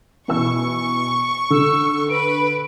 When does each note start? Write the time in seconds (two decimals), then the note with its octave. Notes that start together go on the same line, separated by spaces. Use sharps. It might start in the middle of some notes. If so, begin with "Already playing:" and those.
0.28 B2 E3 C#6 E6
1.50 D3 E6
2.09 B4 D7